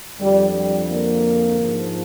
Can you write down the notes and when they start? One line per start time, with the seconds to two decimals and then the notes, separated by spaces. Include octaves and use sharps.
0.19 F2 D3 F3 G3
0.54 G3
0.90 A#3
1.60 G#2 F3